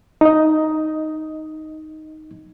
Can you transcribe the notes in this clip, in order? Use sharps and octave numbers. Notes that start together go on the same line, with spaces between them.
D#4 D#5